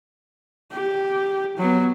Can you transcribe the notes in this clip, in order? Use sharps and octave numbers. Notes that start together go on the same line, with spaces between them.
G4
F#3 B3